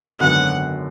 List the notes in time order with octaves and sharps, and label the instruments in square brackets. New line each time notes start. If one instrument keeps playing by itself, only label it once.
[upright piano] G#1 F#2 D3 F#3 B3 [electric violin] F#5